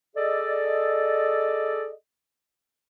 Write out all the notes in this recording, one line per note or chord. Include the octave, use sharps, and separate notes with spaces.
G#4 A4 D5 D#5